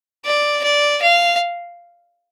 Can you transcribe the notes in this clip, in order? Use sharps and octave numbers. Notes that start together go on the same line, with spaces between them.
D5
D5
F5